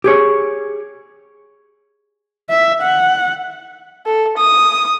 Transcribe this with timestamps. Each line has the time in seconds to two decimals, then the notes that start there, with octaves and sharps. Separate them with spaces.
0.04 G4 G#4 C#5
2.49 E5
2.82 F#5
4.06 A4
4.37 D#6